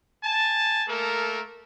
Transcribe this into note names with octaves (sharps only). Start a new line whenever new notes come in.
G#5 A5
A3 A#3 A4 A#4